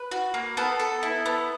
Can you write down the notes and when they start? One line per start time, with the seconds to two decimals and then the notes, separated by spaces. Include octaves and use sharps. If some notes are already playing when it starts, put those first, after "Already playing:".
Already playing: B4
0.11 F#4
0.34 A#3
0.57 B3 A4
0.80 A4
1.03 E4
1.26 B3